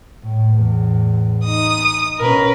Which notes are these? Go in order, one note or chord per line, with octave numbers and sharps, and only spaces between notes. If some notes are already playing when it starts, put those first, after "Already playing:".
A2
E2 A2
D#4 D#6
B2 C#4 A#4 B4